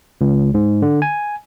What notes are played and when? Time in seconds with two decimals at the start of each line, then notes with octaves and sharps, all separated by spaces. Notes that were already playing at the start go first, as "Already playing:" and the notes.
0.21 C#2
0.54 G#2
0.82 D3
1.02 G#5